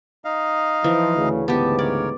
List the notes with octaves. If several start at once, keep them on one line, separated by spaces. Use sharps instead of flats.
D#4 D#5 F5
E3 F3
D2 C#3
D2 G#2 C#3 B3 G4 A5
A#4 C#5 D5